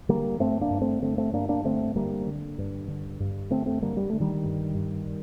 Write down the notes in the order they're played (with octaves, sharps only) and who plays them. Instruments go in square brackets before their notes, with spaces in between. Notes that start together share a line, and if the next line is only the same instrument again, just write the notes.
[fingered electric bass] D3 G3 A#3
G2 A3 C4
A#3 D4
G2
A3 C4
D3 A3 C4
A3 C4
G2 A#3 D4
A#3 D4
D3 A3 C4
D3 G3 A#3
D3
G2
D3
G2
D3 A3 C4
A3 C4
D3 G3 A#3
G3
D3 A3
D#3 G3
G2
G2